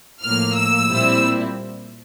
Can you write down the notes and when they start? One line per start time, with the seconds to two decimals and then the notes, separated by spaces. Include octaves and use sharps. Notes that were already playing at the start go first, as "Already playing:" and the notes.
0.23 A2 F3 A#3 F6
0.56 E6
0.89 A#2 G3 C4 E4